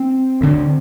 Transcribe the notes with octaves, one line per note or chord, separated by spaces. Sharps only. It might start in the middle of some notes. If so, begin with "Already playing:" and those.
Already playing: C4
D2 D3